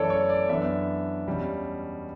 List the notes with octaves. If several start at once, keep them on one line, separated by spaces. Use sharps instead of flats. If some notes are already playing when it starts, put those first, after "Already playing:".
Already playing: F#2 E3 A3 C#4 A4 C#5 D5
C#5
D5
F#2 E3 B3 D4 E5
E2 B2 G3 C#4